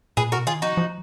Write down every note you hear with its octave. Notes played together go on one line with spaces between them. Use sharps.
A#2 G#4 B4
B2 F#4 A#4
D#3 F4 G#4
F3 D#4 F#4
F3